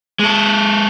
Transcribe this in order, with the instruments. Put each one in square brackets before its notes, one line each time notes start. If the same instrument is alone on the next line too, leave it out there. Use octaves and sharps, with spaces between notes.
[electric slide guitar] G#3 A4